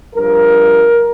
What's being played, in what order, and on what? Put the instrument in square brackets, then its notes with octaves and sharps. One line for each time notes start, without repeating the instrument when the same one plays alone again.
[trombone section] G2 F3 A#4